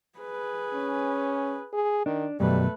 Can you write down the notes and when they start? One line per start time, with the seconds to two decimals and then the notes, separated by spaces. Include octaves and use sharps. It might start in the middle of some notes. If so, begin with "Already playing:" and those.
0.19 G#4 B4
0.74 C#4
1.73 G#4
2.06 D#3 D4
2.40 F#2 B2 F#3 G3 A3 B4